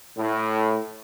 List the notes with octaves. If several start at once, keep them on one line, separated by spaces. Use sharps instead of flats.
A2